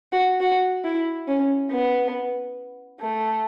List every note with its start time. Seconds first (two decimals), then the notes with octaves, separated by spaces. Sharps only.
0.12 F#4
0.40 F#4
0.84 E4
1.27 C#4
1.70 B3
3.00 A3